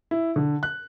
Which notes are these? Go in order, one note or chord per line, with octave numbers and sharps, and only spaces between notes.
E4
D3
F#6